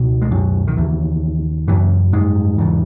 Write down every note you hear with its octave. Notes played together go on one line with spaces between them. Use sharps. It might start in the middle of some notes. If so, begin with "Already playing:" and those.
Already playing: C#2 B2
G#3
F#2 F#3
D#3
D#2 C#3 E3
F#2 C#3 E3
G#2 G#3
E2 C#3